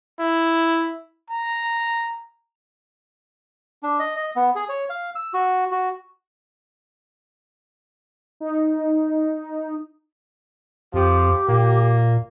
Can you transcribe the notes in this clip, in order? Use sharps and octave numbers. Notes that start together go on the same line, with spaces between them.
E4
A#5
D4
D#5
D#5
B3
G#4
C#5
F5
E6
F#4
F#4
D#4
F2 F3 G4
A#2 A#3